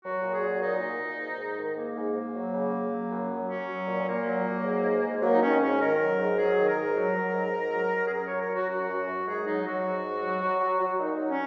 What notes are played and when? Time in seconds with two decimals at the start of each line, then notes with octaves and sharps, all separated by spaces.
0.04 F#3 F#4
0.22 A#2
0.32 G#4
0.42 F#3
0.61 A#2 D#4
0.80 A#2
0.99 A#2
1.19 G#2
1.38 G#2
1.57 D#3
1.76 G#2 A#3
1.96 G#2
2.15 G#2
2.34 F#3
2.53 C#3
2.73 C#3
2.91 F#3
3.11 F#2
3.30 F#3
3.49 F#3 C#4
3.69 F#3
3.87 A#2
4.07 A#2 A#3
4.26 F#3
4.46 F#3
4.64 G#2
4.84 G#2
5.03 G#2
5.22 F#3 A#3
5.32 D#4
5.41 D#3 C#4
5.61 G#2 C#4
5.81 D#3 A#4
6.00 F#3
6.19 G#2
6.37 F#3 G#4
6.57 D#3
6.67 A#4
6.76 G#2
6.96 F#3
7.14 F#3
7.34 G#2
7.53 G#2
7.72 F#3
7.92 F#3
8.06 G#4
8.11 F#2 A#4
8.25 C#5
8.30 F#3
8.40 A#4
8.49 F#3
8.54 F#4
8.68 F#2 F#4
8.88 F#2
9.08 F#2
9.26 G#2 G#4
9.45 F#3 D#4
9.64 F#3 F#4
9.84 G#2
10.03 G#2
10.22 F#3
10.41 F#3
10.61 F#3
10.80 F#3
10.99 A#2 D#4
11.18 F#3
11.29 C#4